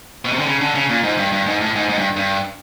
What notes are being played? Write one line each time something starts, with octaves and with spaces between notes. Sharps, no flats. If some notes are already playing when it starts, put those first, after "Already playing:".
B2
C3
D3
C#3
D3
C#3
A#2
G#2
G2
G2
G#2
A2
G#2
G#2
G2
G2